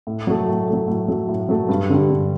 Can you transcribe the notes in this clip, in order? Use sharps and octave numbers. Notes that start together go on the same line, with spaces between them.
A2
F#3 A3
A2
F#3 A3
A2
F#3 A3
A2
F#3 A3
G2
D3 G3
G2